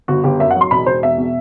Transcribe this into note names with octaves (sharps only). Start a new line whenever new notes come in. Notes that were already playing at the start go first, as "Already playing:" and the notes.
G1 F#4
G1 G4
F#2 E5
F#5
F#3 C6
E1 B5
E1 C5
E2 E5
B2